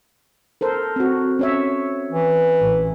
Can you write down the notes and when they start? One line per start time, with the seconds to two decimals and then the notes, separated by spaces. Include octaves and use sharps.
0.61 A4 A#4 C5
0.96 C4 F#4
1.39 C#4 C#5 E5
2.11 E3
2.60 A1